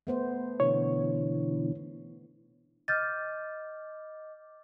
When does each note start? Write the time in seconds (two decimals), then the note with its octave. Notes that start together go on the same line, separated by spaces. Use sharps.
0.07 A3 B3 C5
0.60 B2 D3 E3 C#5
2.88 D#5 D6 F6 G6 A6